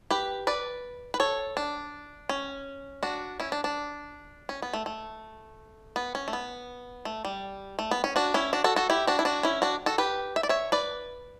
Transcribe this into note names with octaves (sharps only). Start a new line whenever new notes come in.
G4 B4
B4 D5
B4
A4 C#5
D4
C#4
D4 F#4
C#4 E4
D4
D4
C#4
B3
A3
A3
B3
C#4
A3
B3
A3
G3
A3
B3
C#4
D4 F#4
C#4 E4
D4 F#4
F#4 A4
F#4 A4
E4 G4
D4 F#4
E4
D4 F#4
C#4 E4
D4 F#4
F#4 A4
G4 B4
E5
D5
C#5 E5
B4 D5